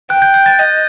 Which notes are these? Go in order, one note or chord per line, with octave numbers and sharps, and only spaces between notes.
G5 F#6
G6
G6
A6
D#5